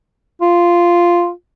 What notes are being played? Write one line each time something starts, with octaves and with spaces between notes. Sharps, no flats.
F4